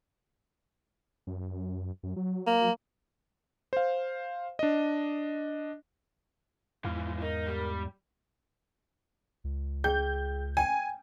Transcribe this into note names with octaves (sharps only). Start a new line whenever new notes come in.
F#2
F#2
F#3
A#3
C5 F5
D4 D#5
E2 G#2 E3 F3 F5
D#4 A#4
G3
C#2
G#4 G5 G6
G5 G#5